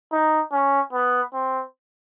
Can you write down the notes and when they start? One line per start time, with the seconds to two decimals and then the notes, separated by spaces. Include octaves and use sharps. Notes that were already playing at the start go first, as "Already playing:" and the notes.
0.12 D#4
0.52 C#4
0.93 B3
1.34 C4